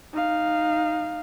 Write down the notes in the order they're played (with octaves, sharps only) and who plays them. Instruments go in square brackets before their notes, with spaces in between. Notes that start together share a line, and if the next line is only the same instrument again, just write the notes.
[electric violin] D#4 F5